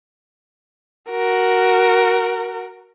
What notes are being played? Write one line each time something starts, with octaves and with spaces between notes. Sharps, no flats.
F#4 A#4